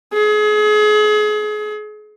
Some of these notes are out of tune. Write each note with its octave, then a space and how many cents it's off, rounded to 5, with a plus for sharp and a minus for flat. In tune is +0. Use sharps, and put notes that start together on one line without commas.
G#4 +35